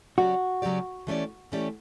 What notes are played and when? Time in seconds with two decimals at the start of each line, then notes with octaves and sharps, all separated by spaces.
0.17 C#3 F#3 C#4 F#4 G4 D5
0.62 C#3 F#3 C#4 G4 D5
1.07 E3 A3 C#4 G4 D5
1.52 E3 A3 C#4 G4 D5